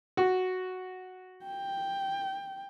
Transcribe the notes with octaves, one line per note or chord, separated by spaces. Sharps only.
F#4
G5